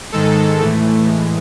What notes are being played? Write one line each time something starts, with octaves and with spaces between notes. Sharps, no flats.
G#2 D#3 G#3 A4
A2 E3 A3
A2 E3 G#3